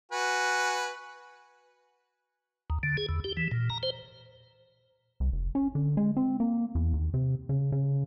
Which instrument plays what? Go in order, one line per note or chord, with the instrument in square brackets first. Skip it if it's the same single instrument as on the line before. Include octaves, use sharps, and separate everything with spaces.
[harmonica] F#4 B4 G#5
[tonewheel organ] D#2
D3
G#4
E2
G4
E3
A#2
A#5
C5
[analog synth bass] C2
F1
C#4
D3
G#3
C4
A#3
E2
D#2
C3
C#3
C#3